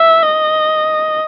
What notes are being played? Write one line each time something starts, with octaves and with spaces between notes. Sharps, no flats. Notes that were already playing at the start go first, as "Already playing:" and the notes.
Already playing: E5
D#5